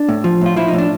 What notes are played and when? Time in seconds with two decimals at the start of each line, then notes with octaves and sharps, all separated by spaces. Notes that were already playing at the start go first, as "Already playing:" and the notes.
Already playing: D4
0.09 A2
0.24 F3
0.41 A2 F4
0.56 F3 E4
0.68 D#4
0.73 A2
0.78 D4